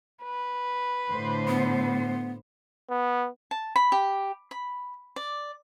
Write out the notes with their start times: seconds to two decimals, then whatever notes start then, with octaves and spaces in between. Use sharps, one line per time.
0.23 B4
1.12 A2 D3 C5
1.48 B3
2.90 B3
3.51 A5
3.76 B5
3.92 G4
4.51 B5
5.16 D5